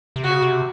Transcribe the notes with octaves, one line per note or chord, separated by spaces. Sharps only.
C3
C#3 F#4
C3